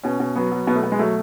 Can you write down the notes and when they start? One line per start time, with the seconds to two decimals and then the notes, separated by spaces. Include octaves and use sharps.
0.03 B2 C#4
0.20 B2
0.35 F#3 B3
0.52 F#3
0.67 B2 B3
0.75 A3
0.83 B2 B3
0.92 G#3
0.99 F#3 A3